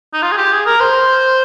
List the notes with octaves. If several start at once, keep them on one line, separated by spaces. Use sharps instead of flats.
D#4
F4
G#4
G4
G#4
A#4
C5